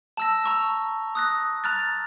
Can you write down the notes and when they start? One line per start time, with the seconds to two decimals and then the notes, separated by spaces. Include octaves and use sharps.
0.17 A5 E6 A#6
0.44 A#5 C#6 E6
1.15 D#6 F#6 A#6
1.64 A#5 F6 F#6 A6